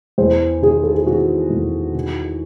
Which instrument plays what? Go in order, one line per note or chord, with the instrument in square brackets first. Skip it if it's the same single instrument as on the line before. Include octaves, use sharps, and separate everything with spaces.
[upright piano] E2 C5
D#3 G#4
A4
G#4
D#3 F#4
E2
D#3